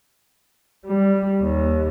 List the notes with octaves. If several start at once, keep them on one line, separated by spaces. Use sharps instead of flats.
G3
D#2